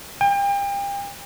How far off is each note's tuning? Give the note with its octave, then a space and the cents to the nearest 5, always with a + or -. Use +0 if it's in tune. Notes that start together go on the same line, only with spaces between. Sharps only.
G5 +35